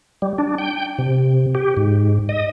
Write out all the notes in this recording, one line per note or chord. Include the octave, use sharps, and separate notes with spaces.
G3
D4
G5
C3
G4
G#2
D#5